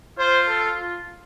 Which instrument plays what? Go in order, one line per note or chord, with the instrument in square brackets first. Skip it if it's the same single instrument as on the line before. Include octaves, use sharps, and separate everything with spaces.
[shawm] F4 [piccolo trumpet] C5
[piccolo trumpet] A4
F4